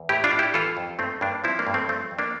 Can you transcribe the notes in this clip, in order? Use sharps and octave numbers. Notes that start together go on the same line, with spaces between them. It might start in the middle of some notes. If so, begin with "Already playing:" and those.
Already playing: E2
A2 E4 G4
D4 F4
A2
E4 G4
E3 F4 A4
F2
G2 A3 C4
G2 A#3 D4
F3 C4 E4
A#3 D4
G2
A3 C4
F3 A3 C4
F2
A#3 D4